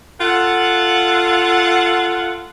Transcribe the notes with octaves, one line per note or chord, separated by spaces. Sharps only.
F4 A4 F5 F#5